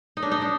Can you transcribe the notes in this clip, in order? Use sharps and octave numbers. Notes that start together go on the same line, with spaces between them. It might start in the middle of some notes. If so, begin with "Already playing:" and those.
D#4
D4
D#4
D4